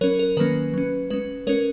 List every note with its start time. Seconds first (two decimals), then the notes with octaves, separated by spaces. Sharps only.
0.01 F#3 C#4 A#4 C#5
0.19 A#4
0.37 D#3 F#3 A#3 C#4 B4
0.74 F#3 C#4
1.10 G#3 C#4 B4
1.47 G#3 C#4 A#4 C#5